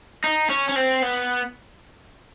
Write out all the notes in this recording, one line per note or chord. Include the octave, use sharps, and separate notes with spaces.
D#4
C#4
C#4
C4
B3